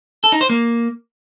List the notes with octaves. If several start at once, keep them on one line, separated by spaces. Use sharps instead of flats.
A4
D#4
C5
A#3